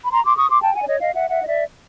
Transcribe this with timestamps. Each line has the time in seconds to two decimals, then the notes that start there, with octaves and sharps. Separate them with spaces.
0.03 B5
0.11 A#5 C6
0.24 C6 D6
0.37 C#6 D#6
0.50 C6 D6
0.62 G5 A5
0.75 F#5 G#5
0.82 D5
0.87 C#5 D#5
1.00 D#5 F5
1.13 E5 F#5
1.30 E5 F#5
1.42 D#5
1.47 D5 E5